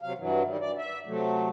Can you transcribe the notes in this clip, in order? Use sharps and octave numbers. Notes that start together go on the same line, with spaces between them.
C3 F#3 F5
G2 E3 F#3
D#3 G3
D5
E5
C3 F#3 A3